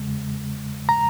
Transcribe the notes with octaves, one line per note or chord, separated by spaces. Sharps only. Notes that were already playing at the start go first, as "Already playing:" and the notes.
Already playing: E2 C#3 G#3
A#5